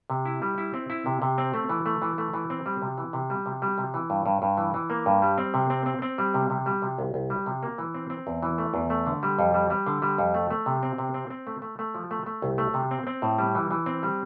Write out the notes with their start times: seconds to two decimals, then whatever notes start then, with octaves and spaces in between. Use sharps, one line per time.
0.10 C3
0.25 E4
0.42 G3
0.58 E4
0.74 C4
0.90 E4
1.06 C3
1.22 C3
1.38 C4
1.54 A3
1.69 E3
1.86 A3
2.02 E3
2.18 A3
2.34 E3
2.50 C4
2.66 G3
2.82 C3
2.98 E3
3.13 C3
3.30 G3
3.46 C3
3.62 G3
3.78 C3
3.94 E3
4.10 G2
4.26 G2
4.42 G2
4.57 E3
4.74 E3
4.90 A#3
5.06 G2
5.22 G3
5.38 C4
5.54 C3
5.70 C4
5.86 C4
6.02 C4
6.18 G3
6.34 C3
6.50 C3
6.66 G3
6.82 C3
6.98 C2
7.14 C2
7.30 G3
7.46 C3
7.63 A#3
7.78 E3
7.94 C4
8.10 C4
8.27 E2
8.43 E3
8.58 A3
8.74 E2
8.90 A3
9.06 D3
9.23 G3
9.39 F2
9.54 G3
9.70 G3
9.87 D3
10.02 G3
10.18 F2
10.34 A3
10.50 A3
10.66 C3
10.83 C4
10.98 C3
11.14 C4
11.30 C4
11.47 A3
11.62 A3
11.79 A3
11.94 F3
12.11 A3
12.26 A3
12.42 C2
12.58 A3
12.74 C3
12.91 C4
13.07 C4
13.22 A2
13.39 G3
13.55 E3
13.71 E3
13.86 C4
14.03 G3